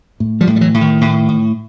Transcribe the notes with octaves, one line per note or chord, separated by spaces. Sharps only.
A2
F3 G3
A2
G3
E3 F#3
A2
D#3
A2
A2